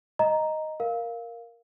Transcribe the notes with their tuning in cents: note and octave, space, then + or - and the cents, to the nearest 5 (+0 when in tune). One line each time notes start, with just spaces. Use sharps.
D#5 +0 A#5 +0
A#4 +0 F5 +0